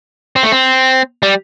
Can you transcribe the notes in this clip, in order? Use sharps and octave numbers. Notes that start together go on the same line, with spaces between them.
C4
A3
C4
G3